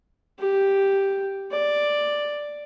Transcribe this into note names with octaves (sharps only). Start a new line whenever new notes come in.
G4
D5